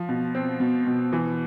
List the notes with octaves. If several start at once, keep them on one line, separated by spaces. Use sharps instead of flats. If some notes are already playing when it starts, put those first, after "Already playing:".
Already playing: F3
B2
C4
B2
B2
E3